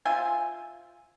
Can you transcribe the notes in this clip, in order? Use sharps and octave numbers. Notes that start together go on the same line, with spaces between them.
F4 C5 E5 G#5